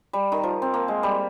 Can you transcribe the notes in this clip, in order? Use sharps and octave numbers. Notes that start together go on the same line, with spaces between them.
G3
D#3
F3
C4
A#3
G#3
G3